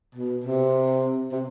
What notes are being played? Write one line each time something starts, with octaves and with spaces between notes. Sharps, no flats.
B2
C3
C3